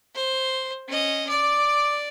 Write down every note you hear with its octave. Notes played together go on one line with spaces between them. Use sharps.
C5
C#4 D#5
D5 D6